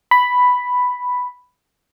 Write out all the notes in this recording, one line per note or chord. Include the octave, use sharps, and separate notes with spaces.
B5